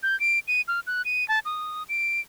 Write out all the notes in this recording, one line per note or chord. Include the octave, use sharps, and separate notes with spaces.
G6
D7
D#7
F6
F#6
D#7
A5
D#6
D7